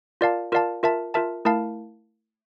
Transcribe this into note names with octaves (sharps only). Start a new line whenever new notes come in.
F4 A#4 D5 F5 A5
F4 A#4 D5 F5 A5
F4 A#4 E5 A5
F4 A#4 E5 A5
A3 E4 A#4 F5 A5